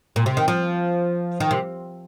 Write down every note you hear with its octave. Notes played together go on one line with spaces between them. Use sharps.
A#2
C3
D#3
F3
D#3
C3